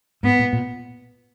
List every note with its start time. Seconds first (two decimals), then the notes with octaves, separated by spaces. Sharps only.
0.23 G#2 B3
0.39 A#2
0.53 A#2